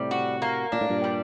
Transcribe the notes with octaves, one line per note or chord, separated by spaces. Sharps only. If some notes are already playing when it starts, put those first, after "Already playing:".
Already playing: A2 C3 G3
F#4
A#3
A#2 D4
A2
G2 A#2
G3